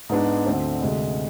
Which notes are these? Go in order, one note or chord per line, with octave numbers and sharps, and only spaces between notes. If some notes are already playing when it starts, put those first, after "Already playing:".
G#2 G#3 B3 D4
D2 D3 A3 C4
D2 C3 G#3